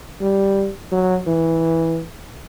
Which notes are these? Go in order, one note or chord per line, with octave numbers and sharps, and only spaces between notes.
G3
F#3
E3